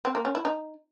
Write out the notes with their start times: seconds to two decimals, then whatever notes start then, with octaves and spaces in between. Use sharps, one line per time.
0.05 C4
0.15 A#3
0.25 C#4
0.35 E4
0.45 D#4